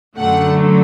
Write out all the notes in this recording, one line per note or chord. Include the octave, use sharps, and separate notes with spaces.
F#2 D3 F#3 A3 F#5